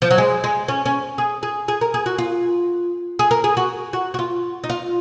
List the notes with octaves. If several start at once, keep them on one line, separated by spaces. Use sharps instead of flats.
F3
F#3
G#3
G#3
C#4
C#4
G#4
G#4
G#4
A#4
G#4
F#4
F4
G#4
A#4
G#4
F#4
F#4
F#4
F4
D#4
F4